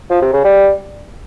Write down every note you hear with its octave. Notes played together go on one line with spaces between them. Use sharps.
F3
C3
C#3
G3